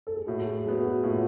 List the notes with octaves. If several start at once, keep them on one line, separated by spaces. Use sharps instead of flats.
A4
G#4
A2 F#4
G#4
F#3 B3 G#4
G#4
F#4
A2 F4